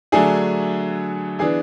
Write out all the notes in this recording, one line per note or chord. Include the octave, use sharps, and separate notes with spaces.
D3 F#3 A3 D4 G#4 G#5
E3 B3 D4 G#4 G#5